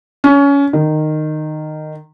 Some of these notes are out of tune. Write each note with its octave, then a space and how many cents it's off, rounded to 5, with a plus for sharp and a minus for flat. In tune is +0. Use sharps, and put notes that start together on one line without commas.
C#4 +25
D#3 -15